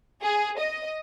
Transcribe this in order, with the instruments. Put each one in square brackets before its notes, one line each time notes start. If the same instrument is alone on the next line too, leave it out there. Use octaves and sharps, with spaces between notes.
[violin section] G#4
D#5